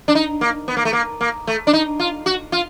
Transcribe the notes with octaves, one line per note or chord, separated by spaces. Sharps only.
D4
D#4
A#3
B3
A#3
A3
A#3
A#3
A3
D4
D#4
F4
F#4
F4